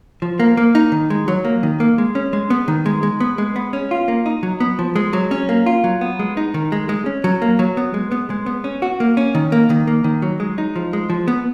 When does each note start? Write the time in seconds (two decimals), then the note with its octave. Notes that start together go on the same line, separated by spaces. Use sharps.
0.22 F3
0.40 A#3
0.57 A#3
0.75 D#4
0.92 D#3
1.10 G#3
1.28 F#3
1.45 A#3
1.63 D#3
1.80 A#3
1.98 G#3
2.15 C#4
2.33 G#3
2.50 B3
2.68 D#3
2.86 G#3
3.03 G#3
3.20 B3
3.38 G#3
3.56 B3
3.73 C#4
3.91 F4
4.08 A#3
4.26 D#4
4.43 F#3
4.60 B3
4.79 F3
4.96 G#3
5.13 F#3
5.31 C#4
5.49 A#3
5.66 F4
5.84 F#3
6.01 B3
6.19 G#3
6.37 D#4
6.54 D#3
6.72 G#3
6.89 G#3
7.06 C#4
7.24 F#3
7.42 A#3
7.59 F#3
7.77 B3
7.94 G#3
8.12 B3
8.30 G#3
8.46 B3
8.64 C#4
8.82 F#4
9.00 A#3
9.17 C#4
9.35 D#3
9.52 A#3
9.70 D#3
9.87 A#3
10.04 D#3
10.22 F#3
10.40 G#3
10.58 D#4
10.76 F3
10.93 G#3
11.10 F3
11.28 B3